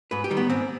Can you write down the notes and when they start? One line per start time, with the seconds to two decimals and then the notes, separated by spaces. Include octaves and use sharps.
0.11 G#2 B4
0.24 G4
0.31 D#3 G3
0.37 B3
0.50 G#2 C4